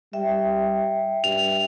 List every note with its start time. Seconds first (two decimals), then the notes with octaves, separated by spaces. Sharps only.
0.13 G3 E5 G5
1.24 G2 F7